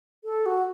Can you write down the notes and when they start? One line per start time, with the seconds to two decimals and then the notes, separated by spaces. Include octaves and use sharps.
0.24 A4
0.46 F#4